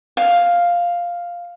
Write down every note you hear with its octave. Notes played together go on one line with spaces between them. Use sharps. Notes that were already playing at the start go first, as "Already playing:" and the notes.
F5